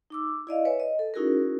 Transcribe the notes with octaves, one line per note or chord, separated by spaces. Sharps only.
D#4 D6 E6
E4 D5 D#5 F5
B4 C#5 E5 G#5
D#5
A4
C#4 D#4 E4 F#4 G#4 A#4